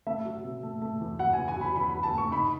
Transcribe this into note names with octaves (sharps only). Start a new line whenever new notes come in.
A3 E5
F#3
B2
A3
A3
E2
F#3 F#5
E2 G#5
G#5
F#3 B5
E2 B5
F#3 B5
A5
A3
C#6
D#4 B5